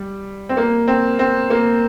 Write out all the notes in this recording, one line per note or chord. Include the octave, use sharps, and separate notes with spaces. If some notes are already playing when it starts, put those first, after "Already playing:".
Already playing: G3
C4
A#3
C4
C4
A#3